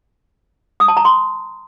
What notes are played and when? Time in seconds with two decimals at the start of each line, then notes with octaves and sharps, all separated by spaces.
0.80 D#6
0.88 A5
0.97 A#5
1.05 C6